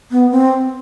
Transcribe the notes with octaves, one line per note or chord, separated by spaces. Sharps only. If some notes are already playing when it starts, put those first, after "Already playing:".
B3
C4